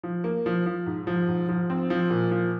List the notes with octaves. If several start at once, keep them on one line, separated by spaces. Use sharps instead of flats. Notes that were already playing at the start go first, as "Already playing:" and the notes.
F3
A#3
F3
F3
G#2
F3
G#2
F3
C4
F3
A#2
F3